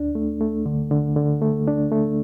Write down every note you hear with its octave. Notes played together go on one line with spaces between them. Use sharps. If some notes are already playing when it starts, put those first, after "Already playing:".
Already playing: D2 D4
A3
A3
D3
D3
D3
A3
D4
A3